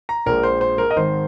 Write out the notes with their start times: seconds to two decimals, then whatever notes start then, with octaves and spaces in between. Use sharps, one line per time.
0.09 A#5
0.26 A#1 A#2 G#3 A#4
0.43 C5
0.61 C5
0.78 A#4
0.91 D#5
0.96 G#1 G#2 D#3 C5